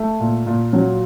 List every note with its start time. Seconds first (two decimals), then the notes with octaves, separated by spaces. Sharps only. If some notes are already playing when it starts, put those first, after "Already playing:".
Already playing: A3
0.20 A#2
0.46 A#2
0.73 F#3